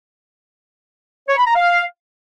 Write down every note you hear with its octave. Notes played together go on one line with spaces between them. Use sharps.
C#5
B5
A#5
F5